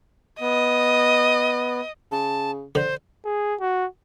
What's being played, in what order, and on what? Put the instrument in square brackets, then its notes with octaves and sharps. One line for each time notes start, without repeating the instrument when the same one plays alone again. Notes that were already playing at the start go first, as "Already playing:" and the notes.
[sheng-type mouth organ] B3 [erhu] D#5
[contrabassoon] C#3 [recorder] A5
[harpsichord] D3 [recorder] C5
[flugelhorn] G#4
F#4